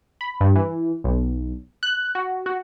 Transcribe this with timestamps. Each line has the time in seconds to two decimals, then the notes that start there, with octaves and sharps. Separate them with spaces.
0.21 B5
0.41 G2
0.56 E3
1.04 B1
1.83 F#6
2.15 F#4
2.46 F#4